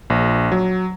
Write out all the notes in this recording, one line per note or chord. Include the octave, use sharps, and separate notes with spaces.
A#1
F#3